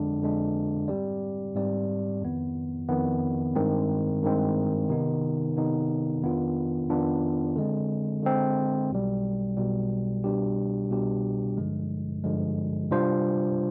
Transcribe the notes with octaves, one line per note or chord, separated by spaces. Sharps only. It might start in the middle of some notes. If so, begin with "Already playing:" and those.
Already playing: G1 F2 D3 G#3 D4
G1 F2 D3 G#3 D4
G#2 G3 C4 G4 D5
G#2 G3 C4 G4 D5
F2 D#3 B3
F2 D#3 B3
G2 D#3 G#3 C4
G2 D#3 G#3 C4
C3 D#3 B3 D#4
C3 D#3 B3 D#4
F2 D#3 B3 D4 F4
F2 D#3 B3 D4 F4
D3 G#3 C4
D3 G#3 C4
B1 B2 G3
B1 B2 G3
C2 B2 G3 D4 G4
C2 B2 G3 D4 G4
G1 G2 D3 F3 G#3
G1 G2 D3 F3 G#3
C3 G3 D4 F4 C5